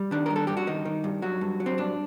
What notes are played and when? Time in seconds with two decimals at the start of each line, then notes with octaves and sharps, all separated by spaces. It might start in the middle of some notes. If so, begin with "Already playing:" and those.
Already playing: G3
0.11 D#3 D4
0.26 A#4
0.30 G2
0.36 A4
0.47 G2 G4
0.57 F#4
0.67 D#3 D#4
0.85 D#3
1.04 G2
1.22 F#3 F#4
1.41 G2
1.60 F#3
1.66 C4
1.78 G2 D4